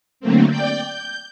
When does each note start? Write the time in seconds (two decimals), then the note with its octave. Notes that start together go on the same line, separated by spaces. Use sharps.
0.20 D3 F#3 A3 A#3 C4
0.50 D5 G5 G6
0.82 G6